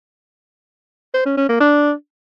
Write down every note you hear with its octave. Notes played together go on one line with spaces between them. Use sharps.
C5
C#4
C#4
A#3
D4